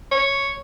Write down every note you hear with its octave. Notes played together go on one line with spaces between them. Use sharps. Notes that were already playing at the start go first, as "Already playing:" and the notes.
C#5